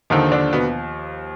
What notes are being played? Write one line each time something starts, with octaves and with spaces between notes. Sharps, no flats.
D#2 D3 D#3 F3 D#4
D3 D4
B2 B3